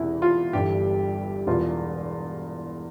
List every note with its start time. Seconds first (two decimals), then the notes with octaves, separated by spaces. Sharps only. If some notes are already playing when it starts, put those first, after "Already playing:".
Already playing: E1 E2 C3 E3 E4
0.22 F4
0.53 G1 G2 E3 G4
1.47 E1 E2 E3 F4